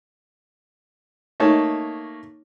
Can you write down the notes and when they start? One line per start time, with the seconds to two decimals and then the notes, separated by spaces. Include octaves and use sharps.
1.40 A3 A#3 D#4 C#5 A5